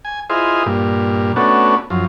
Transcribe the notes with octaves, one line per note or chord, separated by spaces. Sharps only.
G#5
E4 F4 G#4 C5 D#5
G2 A#2
A3 B3 C#4 D4 F#4
F#2 F3